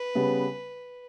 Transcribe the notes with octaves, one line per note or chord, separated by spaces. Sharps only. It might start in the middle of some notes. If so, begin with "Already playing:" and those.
Already playing: B4
C#3 G3 B3